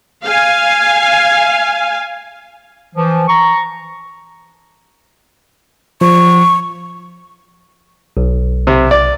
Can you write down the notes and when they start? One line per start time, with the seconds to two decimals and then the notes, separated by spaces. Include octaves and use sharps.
0.24 F5 G#5
2.96 E3 F3
3.28 A#5 C#6
6.01 F3 C#6
8.17 B1
8.67 C3
8.91 D5